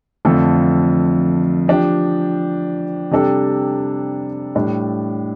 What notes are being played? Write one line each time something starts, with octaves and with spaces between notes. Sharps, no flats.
F2 D3 A3 F4 A4
F3 D4 G4
C3 G3 D4 A4
A2 G3 D4